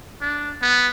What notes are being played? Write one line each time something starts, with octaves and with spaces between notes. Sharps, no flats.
D4
B3